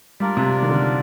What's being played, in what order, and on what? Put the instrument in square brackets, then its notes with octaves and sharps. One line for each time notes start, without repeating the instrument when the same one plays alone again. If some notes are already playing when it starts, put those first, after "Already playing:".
[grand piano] G3 [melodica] D4 F4 A#4 D5
[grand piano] C3
D#3
D3